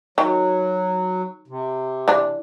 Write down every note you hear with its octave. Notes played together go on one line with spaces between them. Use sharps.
D#3 F#3
C3
E3 D4